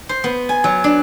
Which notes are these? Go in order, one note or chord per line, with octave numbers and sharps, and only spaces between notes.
C5
B3
G#5
F#3
D4